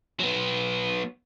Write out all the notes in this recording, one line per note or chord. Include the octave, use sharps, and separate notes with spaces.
F#3 B3